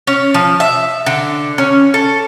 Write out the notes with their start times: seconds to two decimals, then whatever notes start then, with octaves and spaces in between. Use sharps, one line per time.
0.07 C#4
0.34 F3
0.60 E5
1.06 D3
1.58 C#4
1.94 A4